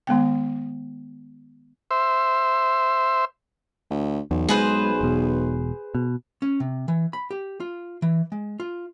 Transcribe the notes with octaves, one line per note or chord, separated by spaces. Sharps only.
D#3 G#3 B3 G5
C5 E5
D2
B1 E2
G#3 G#4 B4 C5
E1 B2
B2
C#4
C3
E3
B5
G4
F4
E3
G#3
F4